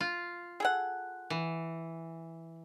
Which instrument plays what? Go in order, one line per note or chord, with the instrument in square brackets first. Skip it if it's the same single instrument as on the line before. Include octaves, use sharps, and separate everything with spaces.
[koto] F4
[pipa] G#4 A4 F#5
[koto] E3